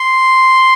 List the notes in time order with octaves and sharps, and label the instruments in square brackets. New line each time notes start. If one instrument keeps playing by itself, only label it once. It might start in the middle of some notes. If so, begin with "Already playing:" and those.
Already playing: [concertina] C6